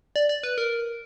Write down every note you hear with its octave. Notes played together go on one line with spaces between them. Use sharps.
D5
D5
B4
A#4